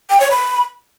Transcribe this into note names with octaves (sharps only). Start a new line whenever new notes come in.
G5
C#5
B5